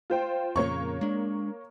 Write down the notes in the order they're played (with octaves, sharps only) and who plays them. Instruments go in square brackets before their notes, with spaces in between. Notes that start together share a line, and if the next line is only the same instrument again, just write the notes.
[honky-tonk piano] F4 C5 G5
[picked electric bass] F2 A#2 C#3 [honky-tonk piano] A#3 C#5 C#6
[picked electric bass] G#3 D4